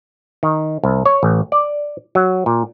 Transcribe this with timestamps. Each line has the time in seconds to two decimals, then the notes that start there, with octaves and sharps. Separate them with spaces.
0.43 D#3
0.83 C2
1.06 C#5
1.23 A1
1.52 D5
2.15 F#3
2.46 A#2